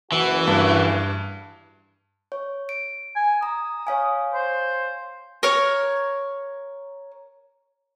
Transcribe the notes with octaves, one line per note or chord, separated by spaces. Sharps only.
F#1 E3 F#4
G2
C#5
D7
G#5
A#5 D#6
C#5 F5 G#5
C5
A#4 C#5